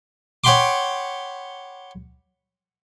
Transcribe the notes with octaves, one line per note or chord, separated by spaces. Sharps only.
C#5 F#5 G5 B5 C6 D6